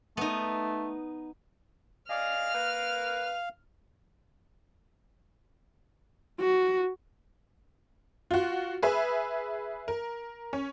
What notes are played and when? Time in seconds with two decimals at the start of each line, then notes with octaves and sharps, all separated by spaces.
0.17 A3 B3 D#4
2.10 G#4 D5 D#5 F5 F6
2.55 A#3 B4
6.40 F#4
8.31 F4 F#4
8.83 G#4 B4 E5
9.88 A#4
10.53 C#4